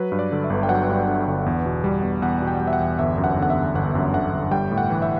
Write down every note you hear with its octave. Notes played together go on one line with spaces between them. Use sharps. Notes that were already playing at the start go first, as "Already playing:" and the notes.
Already playing: F#3 B4
G2
D5
D3
E5
G1
G5
F#3 F#5
G2
D3
G1
E2
B2
G3
E2
E2 F#5
B2
G5
G3
E5
F#5
E2
G1 E5
F#2
F#5
D3
F#5
E5
G1
G1 F#5
F#2
D3 F#5
G1
G3 G5
A2
F#5
E3
E5